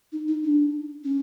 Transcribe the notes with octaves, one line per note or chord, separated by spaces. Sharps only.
D#4
D#4
D4
C#4